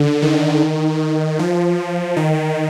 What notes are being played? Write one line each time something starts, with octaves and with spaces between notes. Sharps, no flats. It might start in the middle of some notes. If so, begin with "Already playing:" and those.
Already playing: D3
D#3
F3
D#3